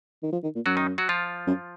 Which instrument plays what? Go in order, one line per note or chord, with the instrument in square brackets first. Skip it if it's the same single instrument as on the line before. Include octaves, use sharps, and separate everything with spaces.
[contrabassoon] D#3
F3
D#3
A#2
[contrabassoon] F#2 [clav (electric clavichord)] F#3 F#4
[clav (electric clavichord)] D#3 D#4
F#3 F#4
F3 F4
[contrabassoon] F#2